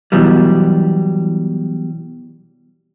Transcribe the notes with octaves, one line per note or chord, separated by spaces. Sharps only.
B2 E3 F#3 G3